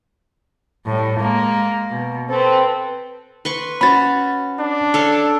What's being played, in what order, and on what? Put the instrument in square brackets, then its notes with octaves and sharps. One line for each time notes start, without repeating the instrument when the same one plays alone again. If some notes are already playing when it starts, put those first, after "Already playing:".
[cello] A2 G3
G#3 A#3
B2
[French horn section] C4 B4 [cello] A4
[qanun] B4 C6 C#6
[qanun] C#4 F#4 [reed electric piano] B5 A6
[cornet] D4
[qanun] A4 C#5 F5